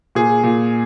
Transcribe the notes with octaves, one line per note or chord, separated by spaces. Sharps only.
A#2 G#4
A#2